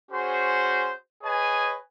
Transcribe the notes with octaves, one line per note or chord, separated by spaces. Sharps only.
C#4 F#4 G#4 C5
G#4 B4 C#5 D#5 G#5